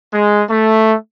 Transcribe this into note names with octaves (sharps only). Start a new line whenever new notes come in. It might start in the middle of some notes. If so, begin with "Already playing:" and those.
G#3
A3